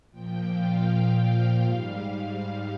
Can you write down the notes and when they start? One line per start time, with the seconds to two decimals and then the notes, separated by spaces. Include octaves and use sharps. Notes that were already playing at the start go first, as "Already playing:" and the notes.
0.11 A#2 F3 G5
0.50 F5
1.62 G#2 G3 F5
2.39 F5